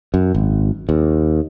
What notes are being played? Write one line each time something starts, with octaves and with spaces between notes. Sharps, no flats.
F#2
G#1
D#2